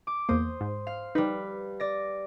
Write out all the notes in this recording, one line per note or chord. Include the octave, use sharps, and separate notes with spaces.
D6
E2 A#3 C5 D#6
G#2
F5
G3 D#4 B4
D5 A#6